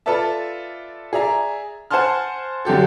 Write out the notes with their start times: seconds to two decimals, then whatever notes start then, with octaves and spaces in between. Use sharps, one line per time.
0.06 F4 A4 B4 D5 E5 A5
1.13 G#4 D5 E5 A#5
1.90 C5 F#5 G#5 A5 C6 F6
2.65 F#2 D3 G4 A4